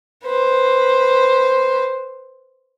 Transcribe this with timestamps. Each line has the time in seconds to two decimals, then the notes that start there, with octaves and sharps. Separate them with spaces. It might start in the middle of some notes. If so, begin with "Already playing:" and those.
0.24 B4 C5